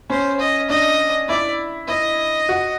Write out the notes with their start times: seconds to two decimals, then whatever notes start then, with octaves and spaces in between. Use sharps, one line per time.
0.10 C#4 C5
0.40 D#5
0.70 D4 D#5
1.29 E4 D5
1.88 E4 D#5
2.49 F#4